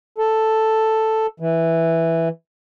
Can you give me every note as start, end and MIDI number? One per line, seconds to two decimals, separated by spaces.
0.18 1.27 69
1.40 2.29 52